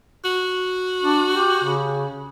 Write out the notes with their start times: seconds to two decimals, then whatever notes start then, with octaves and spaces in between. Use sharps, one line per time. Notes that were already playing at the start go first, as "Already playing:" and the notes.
0.25 F#4
1.03 D4
1.34 G4
1.64 C#3